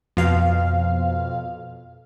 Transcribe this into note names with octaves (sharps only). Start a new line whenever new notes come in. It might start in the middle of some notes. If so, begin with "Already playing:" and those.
F2 B2 F5